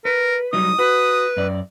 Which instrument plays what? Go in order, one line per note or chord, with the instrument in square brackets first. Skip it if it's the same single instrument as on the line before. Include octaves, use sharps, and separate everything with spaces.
[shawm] A#4 [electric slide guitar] B4
[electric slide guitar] F#3 G3 D#4 [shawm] D#6
[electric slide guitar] F#4 [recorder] B4
[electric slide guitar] F#2 D5